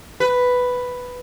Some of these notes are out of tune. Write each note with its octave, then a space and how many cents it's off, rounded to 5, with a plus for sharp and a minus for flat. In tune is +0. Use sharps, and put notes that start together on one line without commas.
B4 +5